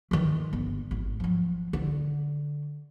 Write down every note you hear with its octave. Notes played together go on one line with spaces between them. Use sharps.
D#3 E3
G1
G#1
F3 F#3
D3